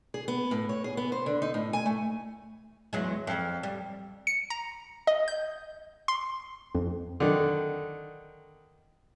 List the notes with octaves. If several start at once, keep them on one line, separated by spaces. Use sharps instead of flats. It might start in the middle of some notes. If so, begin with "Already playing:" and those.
G#4
B3
A2
C#5
G#4
B3
C5
D3
D#4
A2
G#5
A3
E2 F#3 G#3
F2
G3
C#7
A#5
D#5
G6
C6
F2
D3 D#3